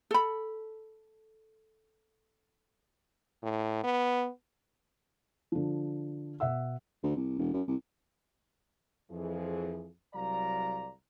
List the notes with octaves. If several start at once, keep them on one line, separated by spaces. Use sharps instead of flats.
A4 B5
A2
B3
D3 F3
B2 E5 F#5 E6
D2
C2
E1
F#2
C2
F2 E3 F3 G#4
C2 F#3 D5 F5 A#5